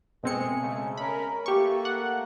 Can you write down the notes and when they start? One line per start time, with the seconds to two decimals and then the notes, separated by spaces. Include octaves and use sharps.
0.24 B2 G#3 A3 C4 G#4 C#7
0.60 C#3 G#3 A3
0.98 C#4 A#4 B5
1.46 A3 A#3 G4 C#6
1.85 F#5